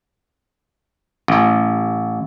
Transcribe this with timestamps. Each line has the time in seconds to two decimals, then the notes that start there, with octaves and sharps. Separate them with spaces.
1.28 A1